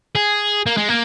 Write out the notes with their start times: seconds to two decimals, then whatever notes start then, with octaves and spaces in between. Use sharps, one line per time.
0.15 G#4
0.66 A#3
0.77 G#3
0.89 A#3